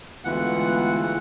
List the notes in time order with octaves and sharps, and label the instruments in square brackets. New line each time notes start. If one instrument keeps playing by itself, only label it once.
[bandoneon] D2 E3 F#5 [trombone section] G#3 B3 F4